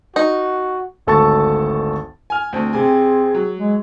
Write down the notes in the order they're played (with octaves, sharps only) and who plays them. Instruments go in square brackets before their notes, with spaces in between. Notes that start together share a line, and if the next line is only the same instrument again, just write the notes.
[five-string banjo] D#4 [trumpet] F#4
[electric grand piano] G#1 D2 A4 A5 C#6 A6
[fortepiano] G#5 F6
[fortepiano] D2 C4 [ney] A5
[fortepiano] C3 G#5 [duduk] C4 [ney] G#4
[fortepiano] F#3
[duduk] G#3